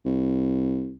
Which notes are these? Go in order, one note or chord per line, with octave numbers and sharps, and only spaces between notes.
C2